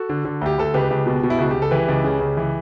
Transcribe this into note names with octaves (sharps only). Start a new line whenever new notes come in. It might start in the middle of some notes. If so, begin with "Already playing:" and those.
Already playing: F#4 A4
D3
D3
D2 G4
D2 A4
C#2 G4 B4
C#2
B2
B2
E4
C#2 F#4
C#2 G4
A4
E3 G4 B4
C#2
C#3
C#2
E3